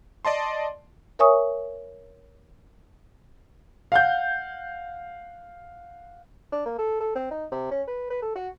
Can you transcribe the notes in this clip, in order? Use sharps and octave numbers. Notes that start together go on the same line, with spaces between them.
D5 D#5 A5 C6
A#4 C#5 E5 G#5 C#6 D#6
F5 F#5 G6
D4
A#3
A4
A4
C4
D#4
C3
C#4
B4
B4
A4
F#4